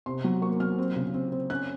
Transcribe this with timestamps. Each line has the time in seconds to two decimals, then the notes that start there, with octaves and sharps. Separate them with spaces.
0.06 C3 C6
0.24 F#3
0.42 A#3 C#6
0.60 F#3 F6
0.78 C4
0.96 C#3
1.14 C4
1.32 C4
1.50 C#4 F#6